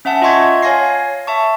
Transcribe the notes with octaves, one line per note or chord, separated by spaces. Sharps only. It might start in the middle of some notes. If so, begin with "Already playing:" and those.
C#4 E5 F#5 A5
F4 D#5 E5 C6 C#6 G#6
C#5 F5 G#5 G#6 A#6 C7
E5 A5 C#6